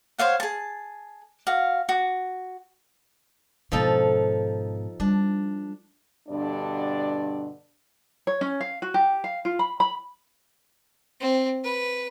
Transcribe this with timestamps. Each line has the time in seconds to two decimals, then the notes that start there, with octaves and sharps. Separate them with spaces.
0.19 C5 C#5 F5 F#5
0.40 G#4 A5
1.47 F#4 F5
1.89 F#4
3.72 G#2 B2 F3 D#4 A4
5.00 G3 D4
6.29 G2 B2 D3 G3 D4 D5
8.27 C#5
8.41 C#4
8.61 F5
8.82 F#4
8.94 G4
9.24 F5
9.45 F4
9.59 B5
9.80 B5
11.20 C4
11.64 B4